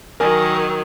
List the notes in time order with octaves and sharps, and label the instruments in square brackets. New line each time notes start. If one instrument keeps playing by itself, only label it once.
[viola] D#3 F#3 [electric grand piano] A#4 G#5